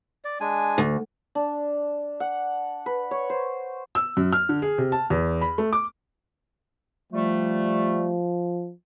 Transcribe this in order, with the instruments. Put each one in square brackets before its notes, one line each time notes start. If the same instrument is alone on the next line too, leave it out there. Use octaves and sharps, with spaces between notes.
[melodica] D5
G#3 D4 G#5
[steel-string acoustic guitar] D2
[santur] D4
F#5
B4
C#5
C5
[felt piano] E6
F#2
F6
D3
G#4
C3
A5
E2
B5
A3
D6
[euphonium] F3 [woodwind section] G3 A3